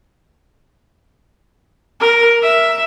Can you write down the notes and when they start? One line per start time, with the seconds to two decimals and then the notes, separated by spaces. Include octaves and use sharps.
2.01 A#4
2.42 E5